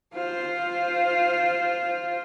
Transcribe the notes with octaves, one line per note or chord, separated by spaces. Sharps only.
F4 C5